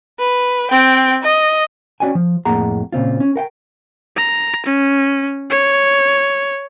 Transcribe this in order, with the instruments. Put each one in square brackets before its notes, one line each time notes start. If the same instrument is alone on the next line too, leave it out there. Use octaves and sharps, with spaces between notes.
[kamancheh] B4
C4 G5
D#5
[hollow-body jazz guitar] C#4 F#4 D5 G5 G#5
F3
F2 A2 A#3 G#4 F#5 A#5
A#2 C#3 C4 F4
C#4
A#4 F#5 G5
[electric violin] A#5
C#4
C#5